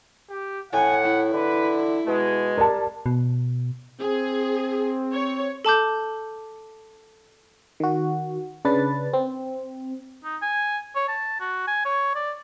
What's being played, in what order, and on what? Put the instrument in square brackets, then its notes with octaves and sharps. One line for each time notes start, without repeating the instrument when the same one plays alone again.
[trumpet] G4
[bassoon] A2 [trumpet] F#5 [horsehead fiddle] G#5
[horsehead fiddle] E4
[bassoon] D3 [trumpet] B4
[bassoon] B2 [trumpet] G#3
[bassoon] G3 [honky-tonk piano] A#4 A5
[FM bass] B2
[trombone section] C4 [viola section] G#4
[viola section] C#5
[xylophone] A4 A5 D6 G6
[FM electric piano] D#3 F#4
C#3 D4 B4 A6
C4
[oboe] D#4
G#5
C#5
A5
F#4
G#5
C#5
D5